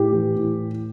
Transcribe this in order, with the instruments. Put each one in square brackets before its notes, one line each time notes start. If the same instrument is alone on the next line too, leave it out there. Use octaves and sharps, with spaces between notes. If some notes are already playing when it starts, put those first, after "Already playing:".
Already playing: [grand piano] A2 G4
E3
A2